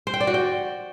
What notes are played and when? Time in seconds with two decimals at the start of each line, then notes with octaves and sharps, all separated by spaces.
0.07 C5
0.14 G5
0.20 D5
0.27 F#4
0.34 G5